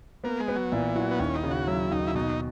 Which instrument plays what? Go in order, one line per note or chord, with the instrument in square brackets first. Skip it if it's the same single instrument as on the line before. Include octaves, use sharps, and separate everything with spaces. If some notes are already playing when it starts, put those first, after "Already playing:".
[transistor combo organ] A#3 [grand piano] B3
[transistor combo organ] G#3
[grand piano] B3
[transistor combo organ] F#3
[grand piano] A#2 [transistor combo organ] E3
[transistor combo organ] F#3 [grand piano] E4
[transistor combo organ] B3
[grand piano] D#2 [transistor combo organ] C#4
[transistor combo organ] D#4
[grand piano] C#3
[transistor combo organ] F#4
[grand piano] F#3 [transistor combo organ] E4
[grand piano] D#2 [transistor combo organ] D#4
[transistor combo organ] E4
[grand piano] B2 [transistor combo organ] D#4